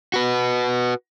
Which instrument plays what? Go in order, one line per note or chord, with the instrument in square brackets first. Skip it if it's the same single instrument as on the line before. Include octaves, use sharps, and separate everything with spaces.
[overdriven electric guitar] F#4 B4